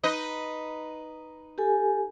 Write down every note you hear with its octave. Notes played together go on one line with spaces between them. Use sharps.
D#4 B4 D#5
G4 A4 G#5